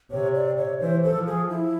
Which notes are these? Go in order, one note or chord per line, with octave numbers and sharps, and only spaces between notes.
C3 C#5
D5
C#5
E3 C5
A4
F3
G#4
E4